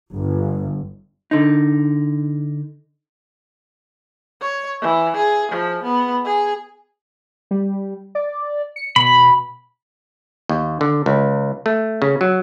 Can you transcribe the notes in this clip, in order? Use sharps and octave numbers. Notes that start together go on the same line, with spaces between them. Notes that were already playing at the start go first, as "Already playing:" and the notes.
G1
D3 D#4
C#5
E3
G#4
F3
B3
G#4
G3
D5
C#7
B2 B5
D#2
D3
C#2
A3
C#3
F#3